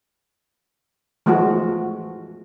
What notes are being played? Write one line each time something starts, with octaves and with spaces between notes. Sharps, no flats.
E3 F3 G#3 A3 F#4